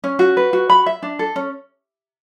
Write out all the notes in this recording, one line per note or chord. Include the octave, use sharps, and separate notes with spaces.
C#4
F#4
B4
F#4
B5
E5
D4
A4
C#4